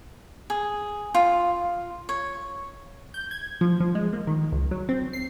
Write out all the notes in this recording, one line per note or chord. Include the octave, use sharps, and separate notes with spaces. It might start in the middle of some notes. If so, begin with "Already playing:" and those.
G#4
F4
C#5
G6
G#6
F3
F3
G#3
A#3
D#3
C#2
F#3
C4
C7